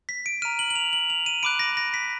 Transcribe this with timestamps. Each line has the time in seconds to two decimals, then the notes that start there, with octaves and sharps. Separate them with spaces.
0.09 B6
0.26 D7
0.42 A#5 F6 D#7
0.59 F#7
0.70 F#7
0.76 F7
0.93 F#7
1.10 F7
1.26 D#7
1.43 B5 D6 F#6 D7
1.59 A#6
1.77 A#6
1.94 B6